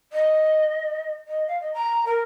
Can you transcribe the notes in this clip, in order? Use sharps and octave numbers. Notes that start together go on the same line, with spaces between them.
D#5
D#5
F5
D#5
A#5
A#4